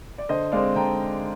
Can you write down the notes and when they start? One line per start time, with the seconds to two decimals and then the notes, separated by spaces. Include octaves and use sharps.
0.18 D5
0.29 D3 C5 D#5
0.52 G#3 C4 D5 F5
0.75 D3 G5 A#5